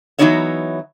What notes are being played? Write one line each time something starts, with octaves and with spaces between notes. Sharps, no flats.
E3 F#3 B3 D#4 C#5 E5